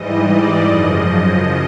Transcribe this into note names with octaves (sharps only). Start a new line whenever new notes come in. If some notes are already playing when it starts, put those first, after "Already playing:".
Already playing: G#2 E3 G3 D#5
D5
F#2 C#3 F3 D#5